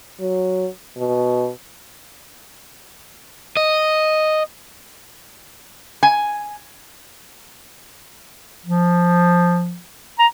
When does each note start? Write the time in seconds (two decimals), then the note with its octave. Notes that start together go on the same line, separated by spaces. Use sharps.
0.20 F#3
0.97 B2
3.57 D#5
6.03 G#5
8.65 F3
10.19 A#5